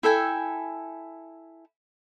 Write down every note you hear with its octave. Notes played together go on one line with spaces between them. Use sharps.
E4 A4 G5 G#5